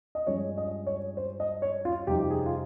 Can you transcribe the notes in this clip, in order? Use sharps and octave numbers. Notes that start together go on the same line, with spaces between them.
D#5
G2 F3 G#3 C#4 C#5
D#5
C#5
C5
D#5
C#5
F4
F2 C3 G3 C4 D#4 G4
G#4
F4